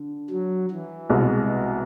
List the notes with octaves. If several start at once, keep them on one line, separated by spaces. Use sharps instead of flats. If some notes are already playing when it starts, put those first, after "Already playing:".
Already playing: D3
F#3
E3
C2 B2 G#3